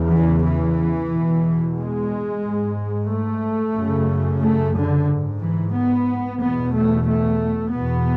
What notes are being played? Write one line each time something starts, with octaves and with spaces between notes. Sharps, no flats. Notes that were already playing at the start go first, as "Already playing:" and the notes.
Already playing: E2 C#3
E3
E3
E2 B2
G#3
G#2
A3
F#2 C#3
A3
D3
G#2
E3
B3
E2 B2 B3
A3
A3
E2 B2 B3